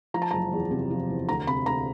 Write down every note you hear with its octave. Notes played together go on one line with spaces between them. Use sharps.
F3 A#5
A5
F#1 A#5
E2
C3
F3
E2
D2 A#5
C3 B5
D2 A#5